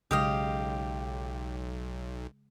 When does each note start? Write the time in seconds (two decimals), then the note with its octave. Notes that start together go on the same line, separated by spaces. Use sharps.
0.11 B1 C#3 G#3 G4 D#5 F5